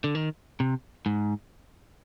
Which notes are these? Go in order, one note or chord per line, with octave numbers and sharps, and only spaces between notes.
D3
D#3
C3
G#2